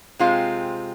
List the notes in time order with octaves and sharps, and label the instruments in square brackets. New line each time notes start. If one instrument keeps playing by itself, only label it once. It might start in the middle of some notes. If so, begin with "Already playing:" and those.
[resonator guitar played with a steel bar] C3 G#3 C4 F4